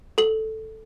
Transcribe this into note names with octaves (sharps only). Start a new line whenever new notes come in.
A4 F#7